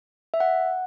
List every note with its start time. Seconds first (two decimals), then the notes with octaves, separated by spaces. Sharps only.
0.34 E5
0.40 F#5